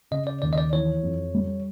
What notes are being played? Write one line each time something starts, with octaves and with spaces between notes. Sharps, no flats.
C#3 D#5
D5
D#2 D5
D#5
D5
E3 C#5
F2
G3